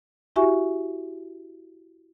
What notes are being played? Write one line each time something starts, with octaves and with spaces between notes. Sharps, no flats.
E4 F#4 G4 E5 G#5 C#6